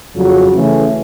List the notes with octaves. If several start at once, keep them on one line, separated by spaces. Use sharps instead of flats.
F2 C#3 F#3
C#3 E3 A3 C#4